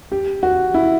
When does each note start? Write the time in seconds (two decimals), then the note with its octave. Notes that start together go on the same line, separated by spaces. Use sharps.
0.12 G4
0.43 F#4
0.74 E4